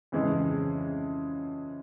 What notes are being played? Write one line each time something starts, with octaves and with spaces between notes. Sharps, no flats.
F2 C#3 E3 G#3